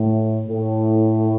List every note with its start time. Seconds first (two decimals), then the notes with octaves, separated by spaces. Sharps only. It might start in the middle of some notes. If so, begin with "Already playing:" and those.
Already playing: A2
0.47 A2